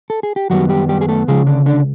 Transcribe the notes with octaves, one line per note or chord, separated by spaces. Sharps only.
A4
G#4
G4
F#2 D#3 F#3 G3 B3 F#4
G3 G4
G3 G4
G#4
A3 A4
C#2 C#3 F3 G#3 G#4
D3 D4
D3 D4